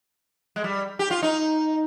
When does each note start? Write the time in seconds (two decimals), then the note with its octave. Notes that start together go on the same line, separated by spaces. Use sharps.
0.56 G#3
0.64 G3
0.99 G4
1.11 F4
1.23 D#4